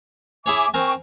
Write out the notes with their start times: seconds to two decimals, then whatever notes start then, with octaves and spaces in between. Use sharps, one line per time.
0.46 E4 G#4 C#5 E5 G#5 D6
0.74 C4 A#4 G5 G#5 C#6